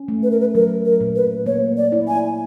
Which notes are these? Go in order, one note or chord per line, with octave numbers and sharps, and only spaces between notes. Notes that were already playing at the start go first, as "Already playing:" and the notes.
Already playing: C#4
A3
B4
A#4
B4
F#3 A#4
A#4
A#2
B4
A#3 C#5
D5
E4
G#5